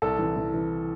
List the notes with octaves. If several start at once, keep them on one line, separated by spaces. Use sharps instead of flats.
C2 A4
E3
E3
E3